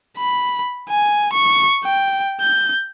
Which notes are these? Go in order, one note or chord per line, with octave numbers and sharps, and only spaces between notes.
B5
G#5
C#6
G5
G6